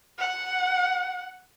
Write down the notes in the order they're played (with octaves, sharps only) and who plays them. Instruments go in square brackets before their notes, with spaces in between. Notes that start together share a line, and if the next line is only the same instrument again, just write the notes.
[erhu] F#5